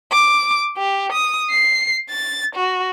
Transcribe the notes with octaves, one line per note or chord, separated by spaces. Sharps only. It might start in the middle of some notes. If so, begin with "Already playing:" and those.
D6
G4
D#6
C7
A6
F#4